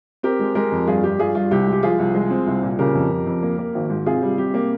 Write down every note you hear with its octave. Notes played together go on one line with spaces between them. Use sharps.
C4 G4 A#4
G#3
G#3 G4 A#4
F2
G2 F4 G#4
G2 G4
G2 F4 G#4
G2 F4
C2 G4
G#3
G4
F3 F4 G#4
C2
G#3
C4
C2
A#2
C#3 G4 A#4
F2
F2
F2
A#3
A#3
G#1
G#2
C3 F4 G#4
G3
C3 G4
A#3